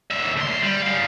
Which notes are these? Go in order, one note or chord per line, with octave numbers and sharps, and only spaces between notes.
D#2 E5
D2 C6
G3
F#3 F5